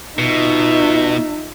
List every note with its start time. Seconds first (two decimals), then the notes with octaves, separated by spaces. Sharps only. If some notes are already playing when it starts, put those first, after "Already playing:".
0.19 B2 D#4 F4 E5